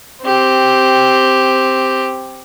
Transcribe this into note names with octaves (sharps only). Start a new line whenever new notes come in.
C4 G4